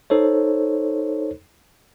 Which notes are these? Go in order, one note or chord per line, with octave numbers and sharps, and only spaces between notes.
D#4 A4 C5 C#5